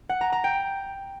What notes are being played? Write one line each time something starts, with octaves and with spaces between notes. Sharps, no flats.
F#5
A#5
A#5
G5